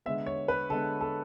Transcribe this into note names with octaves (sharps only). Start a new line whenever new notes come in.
D3 G#3 B3 E5
C#5
B4
D3 G#3 B3 A4
A4